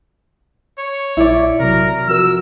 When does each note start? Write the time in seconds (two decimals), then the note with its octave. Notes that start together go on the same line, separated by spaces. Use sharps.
0.79 C#5
1.17 A#1 E4 D5
1.60 C3 F#3 A#4
2.08 F3 F#4 A#4 E6